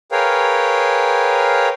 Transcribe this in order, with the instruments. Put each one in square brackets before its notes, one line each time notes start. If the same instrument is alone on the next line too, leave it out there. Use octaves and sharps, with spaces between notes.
[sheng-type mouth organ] G#4 A#4 B4 C#5 F5 G5